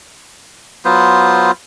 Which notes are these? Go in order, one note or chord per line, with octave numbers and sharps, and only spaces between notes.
F#3 B3 F4 C5